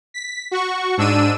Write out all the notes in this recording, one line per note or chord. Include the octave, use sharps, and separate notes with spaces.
B6
F#4 C#6
G#2 D4 E6 D#7